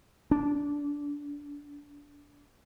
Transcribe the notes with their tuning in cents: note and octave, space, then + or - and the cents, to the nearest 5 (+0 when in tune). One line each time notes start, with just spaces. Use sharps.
D4 -20